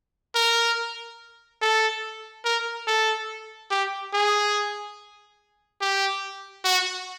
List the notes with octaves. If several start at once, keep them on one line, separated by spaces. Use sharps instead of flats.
A#4
A4
A#4
A4
G4
G#4
G4
F#4